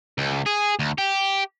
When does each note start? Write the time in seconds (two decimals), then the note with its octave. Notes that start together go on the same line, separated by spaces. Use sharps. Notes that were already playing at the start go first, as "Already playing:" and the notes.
0.18 C#2
0.46 G#4
0.79 D2
0.98 G4